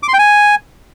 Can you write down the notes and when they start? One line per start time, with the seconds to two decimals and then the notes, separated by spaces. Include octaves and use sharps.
0.03 D6
0.08 C6
0.13 G5
0.19 G#5